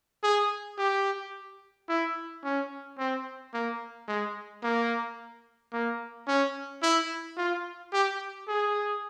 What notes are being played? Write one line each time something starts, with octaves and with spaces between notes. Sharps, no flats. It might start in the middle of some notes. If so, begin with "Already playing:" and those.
G#4
G4
E4
C#4
C4
A#3
G#3
A#3
A#3
C#4
E4
F4
G4
G#4